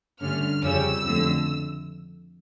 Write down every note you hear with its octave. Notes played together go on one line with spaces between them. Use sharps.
G2 D3 A3 C#4 F6
F2 C#3 G3 C#4 E6
F2 D3 A3